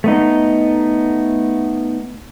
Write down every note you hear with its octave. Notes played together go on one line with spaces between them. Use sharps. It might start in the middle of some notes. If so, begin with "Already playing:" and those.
A3 B3 D#4